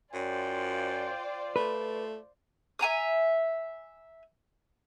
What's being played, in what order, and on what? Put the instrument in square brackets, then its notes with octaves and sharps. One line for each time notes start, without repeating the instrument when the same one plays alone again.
[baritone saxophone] F#2 [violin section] F4 C5 D5 [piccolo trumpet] G5
[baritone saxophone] A3 [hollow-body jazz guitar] B4
[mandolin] E5 G#5 A#5 D#6